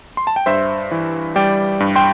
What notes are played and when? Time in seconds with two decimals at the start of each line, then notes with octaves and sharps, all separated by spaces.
0.17 C6
0.27 A5
0.36 G5
0.46 G2 C5 E5
0.91 E3
1.36 G3 D5 G5
1.80 G2
1.96 G5 C6